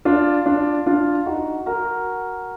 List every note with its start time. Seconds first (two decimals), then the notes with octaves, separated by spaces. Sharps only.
0.05 D4 F4
0.46 D4 F4
0.86 D4 F4
1.26 D#4 F#4
1.66 F#4 A#4